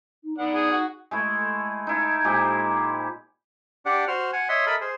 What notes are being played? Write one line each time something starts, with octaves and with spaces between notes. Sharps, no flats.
D#4
B3 D4 D#4 F#5
G#4
F#4 F#5
G#3 A3 E4
D#4 E4 A5
A#2 G#3 G4 C5
D4 G4 D5 F#5
F#4 C5 F6
F#5 G#5
C#5 D#5 E5 C6
A4 A#4 D#5 E5 B5
G#4 C5